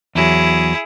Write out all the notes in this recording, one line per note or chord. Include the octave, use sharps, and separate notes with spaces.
E2 F#3 E4 G#4